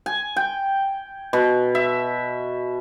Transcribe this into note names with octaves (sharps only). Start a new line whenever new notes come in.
G#5
G5
B2
E5